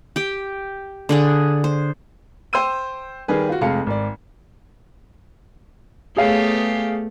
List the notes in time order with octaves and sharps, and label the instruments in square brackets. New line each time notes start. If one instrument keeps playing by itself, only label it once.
[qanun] G4 G5
D3 D4 G#4
C5
[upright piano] C5 G5 C6 E6 G6 D#7
D#3 G3 G#4 B4
F4 F#4
F1 F2 G#3 F5 A5 C#7
G#1 D5
[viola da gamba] A3 B3 G4 [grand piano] G#4 C#5 F5